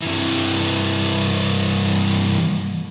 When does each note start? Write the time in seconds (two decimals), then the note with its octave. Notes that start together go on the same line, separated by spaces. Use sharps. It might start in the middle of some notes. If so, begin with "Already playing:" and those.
0.01 G2 E3